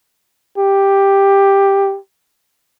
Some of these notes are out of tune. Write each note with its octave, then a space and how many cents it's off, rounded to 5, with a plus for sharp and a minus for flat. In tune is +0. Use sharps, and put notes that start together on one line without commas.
G4 +5